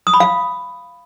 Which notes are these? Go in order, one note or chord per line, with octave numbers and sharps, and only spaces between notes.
D#6
B5
F5